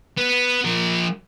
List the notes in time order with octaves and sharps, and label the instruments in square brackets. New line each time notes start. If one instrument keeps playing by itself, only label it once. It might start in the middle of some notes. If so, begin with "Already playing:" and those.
[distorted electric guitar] B3
F3 A#4